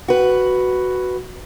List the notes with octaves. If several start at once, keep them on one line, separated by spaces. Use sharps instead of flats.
F#4 B4